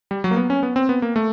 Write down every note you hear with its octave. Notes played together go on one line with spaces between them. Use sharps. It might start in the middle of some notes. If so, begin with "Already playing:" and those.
G3
F#3
A#3
B3
C#4
B3
C4
B3
A#3
A3